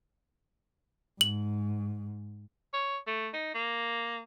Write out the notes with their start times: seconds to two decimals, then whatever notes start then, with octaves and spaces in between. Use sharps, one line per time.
1.21 G#2 F#7
2.73 C#5
3.07 A3
3.34 D#4
3.54 A#3